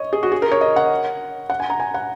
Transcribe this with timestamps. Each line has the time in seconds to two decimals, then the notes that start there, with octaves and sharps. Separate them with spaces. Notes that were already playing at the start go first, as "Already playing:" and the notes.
Already playing: C#5 D#5
0.13 G#4
0.23 F#4
0.32 G#4
0.42 A#4
0.51 C#5
0.61 D#5
0.76 F#5
1.50 F#5
1.60 G#5
1.70 A#5
1.80 G#5
1.94 F#5